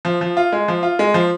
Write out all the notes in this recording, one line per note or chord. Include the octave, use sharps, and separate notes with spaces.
F3
F3
F4
G#3
F3
F4
G#3
F3